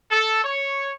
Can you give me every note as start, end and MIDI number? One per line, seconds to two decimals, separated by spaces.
0.11 0.43 69
0.44 0.91 73